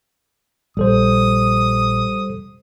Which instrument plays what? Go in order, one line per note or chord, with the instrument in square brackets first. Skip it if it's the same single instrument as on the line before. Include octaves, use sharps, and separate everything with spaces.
[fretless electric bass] A#1 [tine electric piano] G3 A4 C5 [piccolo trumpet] D#6